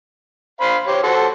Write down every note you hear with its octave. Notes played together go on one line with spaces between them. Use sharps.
C5 F5 B5
G4 C5 C#5
F#4 A4 C5